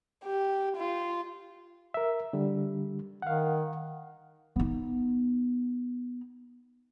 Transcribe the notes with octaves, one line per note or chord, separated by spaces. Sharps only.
G4
F4
A#4 E5
D3 G3
D#3 F5 F#5
B3 D#4